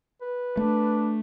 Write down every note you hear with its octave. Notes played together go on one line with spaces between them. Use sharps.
B4
A3 D4